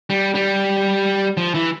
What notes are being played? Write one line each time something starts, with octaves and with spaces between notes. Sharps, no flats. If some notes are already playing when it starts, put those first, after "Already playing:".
G3
G3
F3
E3